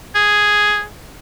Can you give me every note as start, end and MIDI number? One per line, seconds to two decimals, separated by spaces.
0.15 0.84 68